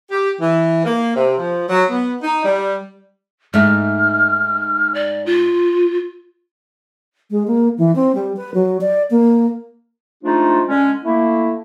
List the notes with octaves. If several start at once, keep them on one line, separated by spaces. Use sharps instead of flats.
G4
E3
A#3
C3
F3
F#3
B3
D#4
G3
G#2 A3 D#4 F6
D5
F4
G#3
A#3
E3
C4
G3
B4
F#3
D5
A#3
F3 G#3 A3 D4 D#4 F4
D3 G#3 C#4
A3 A#3 E4